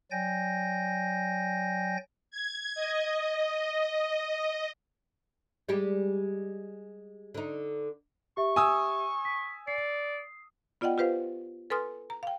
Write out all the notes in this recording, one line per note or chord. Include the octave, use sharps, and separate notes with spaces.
F#3 D5 G5 G#5 G6 A#6
G#6
D#5
G3 G#3 G4
D3 D#4
G4 E5 C#6
G#5 D#6 E6
B6
D5 C7
B3 F4 D5 D#5 F#5 G5
F4 G4 B4 C5 F5
A4 B4 G#5 C6 D#6 F6
A#5
F5 G5